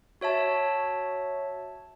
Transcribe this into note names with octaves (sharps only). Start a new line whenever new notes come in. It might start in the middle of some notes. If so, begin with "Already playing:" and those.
F#4 C#5 E5 A5